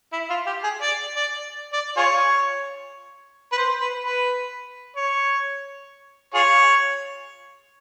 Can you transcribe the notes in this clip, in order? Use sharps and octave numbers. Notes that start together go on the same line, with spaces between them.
E4
F4
G4
G#4
D5
D5
D5
F4 G#4 C#5
B4
C5
B4
B4
C#5
F4 G#4 C#5